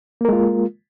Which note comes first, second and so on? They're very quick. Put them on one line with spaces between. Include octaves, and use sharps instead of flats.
A#3 A#4 G#3 F4